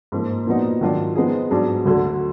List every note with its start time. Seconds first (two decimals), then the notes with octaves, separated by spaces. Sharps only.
0.12 G#2 F3 A#3
0.46 A#2 F3 B3 D#4 F#4
0.81 G#2 D#3 F#3 D4 F4
1.16 F3 G#3 B3 D#4 G#4
1.50 G#2 F#3 B3 D4 G#4
1.86 D2 D3 F#3